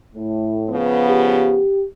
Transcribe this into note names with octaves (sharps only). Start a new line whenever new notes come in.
A2
C#3 F3 B3
G4